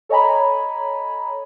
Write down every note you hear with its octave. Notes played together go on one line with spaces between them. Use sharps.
A4 C#5 D#5 G#5 A#5 B5